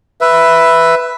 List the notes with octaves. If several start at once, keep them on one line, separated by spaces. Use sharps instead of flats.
B4 E5